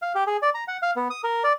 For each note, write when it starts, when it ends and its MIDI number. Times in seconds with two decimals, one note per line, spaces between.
0.02 0.13 77
0.15 0.24 67
0.27 0.37 68
0.42 0.50 74
0.54 0.64 82
0.68 0.77 78
0.82 0.91 77
0.96 1.08 59
1.10 1.21 87
1.24 1.43 70
1.44 1.53 74